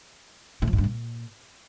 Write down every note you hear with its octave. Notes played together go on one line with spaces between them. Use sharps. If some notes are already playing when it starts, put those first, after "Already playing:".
A2
F3
G#2
G2
A#2